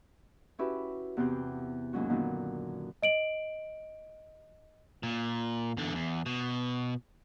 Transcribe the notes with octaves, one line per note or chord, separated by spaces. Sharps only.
C#4 E4 F#4 G4 B4 E5
E2 C3 B3 C4 G4 G6
D#2 G#2 F#3 C#4 F#4
F#2 A#2 D3 D#3 B3
D#5 D7 F#7
A#2
E2 D3
E2
B2